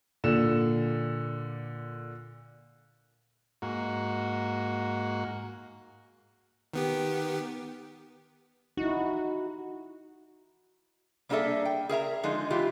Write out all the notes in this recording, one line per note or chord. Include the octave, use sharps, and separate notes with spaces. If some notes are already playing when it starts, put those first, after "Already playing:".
A#2 D3 E7
G#2 A#3 F#4
D#3 B3 G4
D#4 E4 F#4
G3 A#3 D4 G#4 A4 E5
G5
G#4 A#4 E5 A#5
D3 F3 G#3 D#4
E3 F4 G4 E5